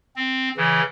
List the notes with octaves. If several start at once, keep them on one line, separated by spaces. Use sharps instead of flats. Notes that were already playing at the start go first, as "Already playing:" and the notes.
C4
C#3 E3